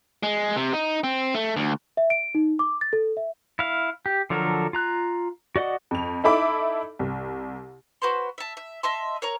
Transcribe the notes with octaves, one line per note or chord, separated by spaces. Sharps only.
G#3
C3
D#4
C4
A3
D2
E5
D7
D#4
D6
A6
A4
E5
E4 F5
G4
D3 F3 F#3 A4 A#4
F4 A#5 F#6
F#4 D5 D#5 F#5
F2 F7
D#4 E4 A4 E5 B5 D6
C2
F#4 B4 C5 C6
E5 A5
E5
D#5 E5 A5 C6
A#4 C#5 A#5